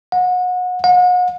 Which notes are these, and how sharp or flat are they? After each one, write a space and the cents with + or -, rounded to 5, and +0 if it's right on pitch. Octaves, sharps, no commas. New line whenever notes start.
F#5 -30
F#5 -40